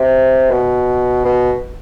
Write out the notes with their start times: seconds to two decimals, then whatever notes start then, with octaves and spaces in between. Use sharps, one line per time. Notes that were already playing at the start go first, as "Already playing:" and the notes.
Already playing: C3
0.50 B2
1.25 B2